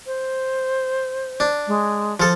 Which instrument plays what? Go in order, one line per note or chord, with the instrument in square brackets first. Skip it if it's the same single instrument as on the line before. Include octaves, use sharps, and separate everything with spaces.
[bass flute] C5
[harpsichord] D4
[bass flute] G#3
[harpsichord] F3 A4